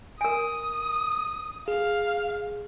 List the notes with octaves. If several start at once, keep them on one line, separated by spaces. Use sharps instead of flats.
A#4 G#5 D#6
G#4 F5